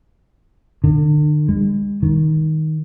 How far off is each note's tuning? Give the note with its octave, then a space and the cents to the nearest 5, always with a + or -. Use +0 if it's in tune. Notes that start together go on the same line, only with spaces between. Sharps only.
D3 +40
G#3 -40
D#3 +10